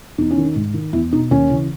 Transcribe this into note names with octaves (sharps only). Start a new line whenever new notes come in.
E2 D#4
C#4
D#3
D#4
G#2
D#3
E2 E4
B2 D#4
D#2 C#4
C#3 E3